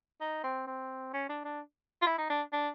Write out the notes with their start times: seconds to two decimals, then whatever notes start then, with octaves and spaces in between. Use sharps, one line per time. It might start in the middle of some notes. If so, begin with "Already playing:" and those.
0.21 D#4
0.44 C4
0.67 C4
1.14 C#4
1.29 D4
1.44 D4
2.02 F4
2.07 E4
2.18 D#4
2.30 D4
2.53 D4